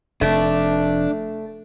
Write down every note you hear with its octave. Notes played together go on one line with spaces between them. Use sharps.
F1 A3 D4